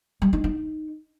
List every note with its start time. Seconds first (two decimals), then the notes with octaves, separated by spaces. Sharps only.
0.22 G3
0.33 D#4
0.44 D#4